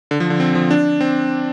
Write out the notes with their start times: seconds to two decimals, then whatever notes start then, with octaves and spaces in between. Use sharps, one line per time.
0.11 D3
0.20 F3
0.30 D3
0.40 C4
0.55 F3
0.71 D4
1.01 C4